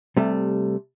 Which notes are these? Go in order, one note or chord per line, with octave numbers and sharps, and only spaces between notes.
C3 G3 A3